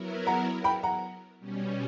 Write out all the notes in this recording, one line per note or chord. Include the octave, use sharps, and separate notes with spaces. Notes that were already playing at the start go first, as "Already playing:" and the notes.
Already playing: F#3 B3 E4 A#4
F#5 A#5
G5 B5
F#5 A#5
B2 G3 C#4